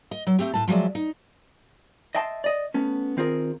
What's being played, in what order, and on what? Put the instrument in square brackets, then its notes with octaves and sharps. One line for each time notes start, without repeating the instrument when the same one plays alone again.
[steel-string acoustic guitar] D#5
F#3
A3 C4 G4
A2 A5
F3 F#3 G#3 D5 E5
D#4
[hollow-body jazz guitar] D#5 E5 G5 A5 C6
D5 D#5
A3 B3 C#4
D#3 C4 F4 G#4 A#4